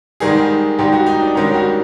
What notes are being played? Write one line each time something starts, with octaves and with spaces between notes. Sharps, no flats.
G#2 D#3 G3 G#4
G#2 D#3 G3 G4
F#4
D#4
D4
G#2 D#3 G3 C#4
F#4